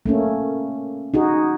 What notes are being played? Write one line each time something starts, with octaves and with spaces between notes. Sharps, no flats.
A3 A#3 C#4
D#4 F#4 G#4